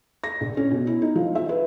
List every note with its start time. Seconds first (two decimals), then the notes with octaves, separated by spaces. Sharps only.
0.24 A#6
0.41 A#1
0.57 C#4
0.71 B2
0.87 E4
1.02 D#4
1.16 F3
1.35 E5
1.49 B4